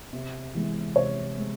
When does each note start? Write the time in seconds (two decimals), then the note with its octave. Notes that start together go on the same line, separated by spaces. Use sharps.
0.13 C3
0.54 E3 G#3
0.96 C3 C#5
1.38 G#3